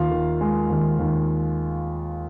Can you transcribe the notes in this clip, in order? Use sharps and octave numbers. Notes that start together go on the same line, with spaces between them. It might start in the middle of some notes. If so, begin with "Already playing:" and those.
Already playing: D#2 F4 F5
D#3
G#3
D#2
D#2